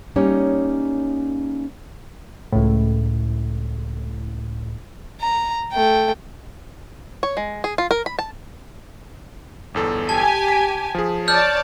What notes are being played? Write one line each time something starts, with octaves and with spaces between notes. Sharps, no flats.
G3 A#3 C#4 D#4 C#5
C#2 A2
A#5
A3 G5
C#5
G#3
G#4
F4
A#4
B5
A5
G1 E2 A4
G4 G#5 A5
B6
F3 G#4
C#5 D5 A5 F6 G6